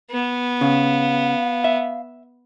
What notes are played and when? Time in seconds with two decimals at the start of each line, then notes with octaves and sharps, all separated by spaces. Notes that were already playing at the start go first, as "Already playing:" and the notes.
0.10 B3
0.61 C#3 F5
1.64 E5